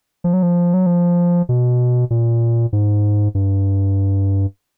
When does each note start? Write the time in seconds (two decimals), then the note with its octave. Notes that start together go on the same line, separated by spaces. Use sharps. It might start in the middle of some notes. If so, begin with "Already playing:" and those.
0.24 F3
0.33 F#3
0.43 F3
0.74 F#3
0.86 F3
1.49 B2
2.10 A#2
2.73 G#2
3.35 G2